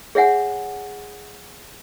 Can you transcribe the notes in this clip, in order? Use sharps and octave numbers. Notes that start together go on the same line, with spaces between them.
G#4 C#5 E5 F#5 G#5